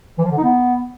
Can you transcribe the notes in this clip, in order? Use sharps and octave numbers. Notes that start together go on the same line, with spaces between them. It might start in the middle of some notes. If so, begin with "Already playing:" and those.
E3
F3
D3
D#4
B3